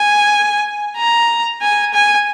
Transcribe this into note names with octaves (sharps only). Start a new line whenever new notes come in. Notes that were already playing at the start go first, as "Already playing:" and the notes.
Already playing: G#5
A#5
G#5
G#5